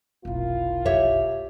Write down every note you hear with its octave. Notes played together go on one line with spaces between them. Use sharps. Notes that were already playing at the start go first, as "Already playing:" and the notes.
F1 B1 A#3 E4 F4
G4 C#5 E5